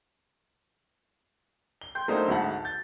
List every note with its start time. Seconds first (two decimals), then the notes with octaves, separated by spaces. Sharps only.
1.81 G7
1.95 G5 C6 G6
2.08 F#3 A3 A#3 D4 D#4 C5
2.28 D2 G#2 F#4 E5 F#5 A5
2.65 G6 A6